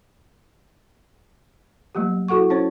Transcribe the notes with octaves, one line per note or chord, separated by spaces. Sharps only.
F#3 G3 A3 A#3 G4
E4 F#4 A4 F#5 C#6
C#4 E4 C5 C#5